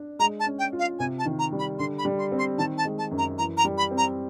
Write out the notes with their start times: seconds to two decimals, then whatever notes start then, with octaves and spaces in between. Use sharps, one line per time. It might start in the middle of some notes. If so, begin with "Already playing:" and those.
Already playing: D4
0.19 G#3 A#5
0.40 A5
0.46 C#4
0.59 G5
0.72 F4
0.79 F5
0.99 C3 G#5
1.19 A5
1.26 D#3
1.39 A#5
1.52 G3
1.59 B5
1.79 D3 C6
1.98 B5
2.05 G3
2.19 C6
2.32 C4
2.38 C6
2.58 D#3 A5
2.78 A5
2.85 G#3
2.98 A5
3.11 F#2
3.18 A#5
3.38 E3 A#5
3.57 A#5
3.65 G3
3.77 B5
3.91 C4
3.97 A#5